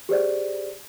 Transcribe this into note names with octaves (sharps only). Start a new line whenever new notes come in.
G4 G#4 C5 D5